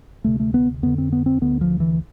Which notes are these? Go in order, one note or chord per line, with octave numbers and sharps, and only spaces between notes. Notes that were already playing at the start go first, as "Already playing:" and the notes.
D2 C3 A3
A3
B3
F2 D3 B3
C4
B3
C4
D2 D3 B3
F3
E3